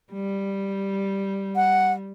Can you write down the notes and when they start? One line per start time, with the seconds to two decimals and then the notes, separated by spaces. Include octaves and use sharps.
0.13 G3
1.56 F#5